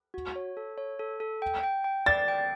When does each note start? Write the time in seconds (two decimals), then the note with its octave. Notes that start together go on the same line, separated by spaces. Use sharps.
0.14 F#4
0.36 C#5
0.57 A4
0.78 C#5
0.99 A4
1.20 A4
1.42 G5
1.63 G5
1.84 G5
2.06 D5 A6
2.28 G5